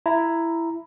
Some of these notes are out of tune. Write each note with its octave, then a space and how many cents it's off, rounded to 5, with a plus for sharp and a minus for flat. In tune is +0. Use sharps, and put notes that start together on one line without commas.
E4 +10 A#5 +0